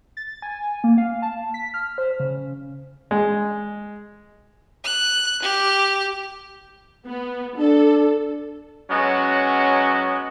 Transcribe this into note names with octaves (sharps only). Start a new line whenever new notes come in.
A6
G#5
A#3
F5
A5
B6
F6
C5
C#3
G#3
F#6
G4
B3
D4 A4
F#3 G#3 B3 C#4 F#4